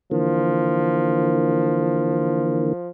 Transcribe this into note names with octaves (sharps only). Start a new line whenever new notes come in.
D3 E3 F3 A#3